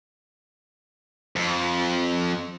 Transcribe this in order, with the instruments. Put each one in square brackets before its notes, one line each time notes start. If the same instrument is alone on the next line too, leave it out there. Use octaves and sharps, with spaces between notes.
[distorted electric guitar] F2